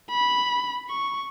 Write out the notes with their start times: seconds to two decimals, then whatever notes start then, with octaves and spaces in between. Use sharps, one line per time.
0.10 B5
0.89 C#6